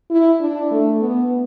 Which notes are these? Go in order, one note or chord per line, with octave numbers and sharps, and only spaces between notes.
E4
D4
A3
B3